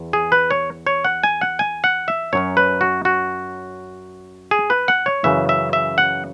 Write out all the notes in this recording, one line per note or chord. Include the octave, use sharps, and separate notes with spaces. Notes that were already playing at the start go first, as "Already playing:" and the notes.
Already playing: E2
G#4
B4
C#5
C#5
F#5
G#5
F#5
G#5
F#5
E5
F#2 F#3 C#4 C#5
B4
F#4
F#4
G#4
B4
F#5
C#5
F#2 C#3 E3 E5
E5
E5
F#5